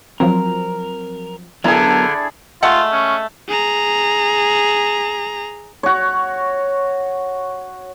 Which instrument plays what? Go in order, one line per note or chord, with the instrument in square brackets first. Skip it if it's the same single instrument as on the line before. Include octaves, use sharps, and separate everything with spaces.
[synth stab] F3 F#3 C4 [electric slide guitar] A#4
[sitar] D3 [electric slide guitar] F#3 B3 A#4 [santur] E4 G#4
[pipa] G#3 A3 F#5 [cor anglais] F4
[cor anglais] C#4
[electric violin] G#4 A#5
[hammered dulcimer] F#4 C#5